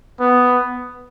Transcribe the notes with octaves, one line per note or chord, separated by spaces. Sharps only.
B3